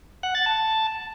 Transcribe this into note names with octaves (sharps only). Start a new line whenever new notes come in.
F#5
A6
A5